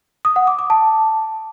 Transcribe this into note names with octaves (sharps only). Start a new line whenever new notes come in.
D#6
F#5
D6
D6
A5